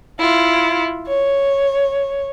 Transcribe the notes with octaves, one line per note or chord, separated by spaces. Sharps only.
E4 F4
C#5